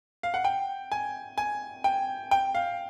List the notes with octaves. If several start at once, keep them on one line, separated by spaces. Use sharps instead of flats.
F5
F#5
G5
G#5
G#5
G5
G5
F5